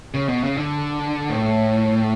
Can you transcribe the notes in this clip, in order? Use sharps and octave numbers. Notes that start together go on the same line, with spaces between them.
C#3
B2
C#3
D3
A2